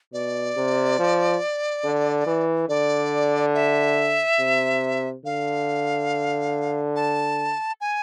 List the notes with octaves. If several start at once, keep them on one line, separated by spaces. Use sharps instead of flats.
B2 D5
C3
F3
D3
E3
D3 D5
E5
C3
D3 F5
A5
G#5